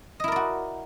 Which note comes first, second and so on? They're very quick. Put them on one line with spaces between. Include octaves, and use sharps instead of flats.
D#5 E4 A#4 D5 F#4